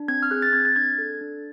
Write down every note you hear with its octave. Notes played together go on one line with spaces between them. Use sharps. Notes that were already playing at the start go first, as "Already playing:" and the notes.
Already playing: D4
C4 G#6
F6
G#4 F#6
A6
C4 G#6
A6
D4 G#6
A4
D4